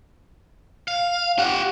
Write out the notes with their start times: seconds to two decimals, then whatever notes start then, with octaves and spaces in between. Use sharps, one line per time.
0.88 F5
1.39 G4 F#5